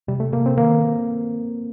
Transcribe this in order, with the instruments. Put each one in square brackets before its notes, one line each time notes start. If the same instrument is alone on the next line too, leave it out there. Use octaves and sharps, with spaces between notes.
[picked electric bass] C3 [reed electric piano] G3
[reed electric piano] A3
[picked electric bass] C3 [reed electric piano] A#3
[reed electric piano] C4
[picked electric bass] D#3 [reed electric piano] A#3